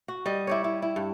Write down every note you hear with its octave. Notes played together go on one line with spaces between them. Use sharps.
F#4
G3 D#5
E4 G4 C#5
E4
E4
G2